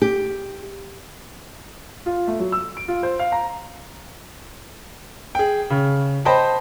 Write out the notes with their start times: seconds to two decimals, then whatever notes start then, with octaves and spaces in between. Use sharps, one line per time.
0.02 G4
2.06 F4
2.27 A3
2.39 F#3
2.52 E6
2.77 D7
2.88 F4
3.03 C5
3.19 F5
3.32 A#5
5.35 G#4 G5
5.70 C#3
6.25 C5 D#5 G5 A5 B5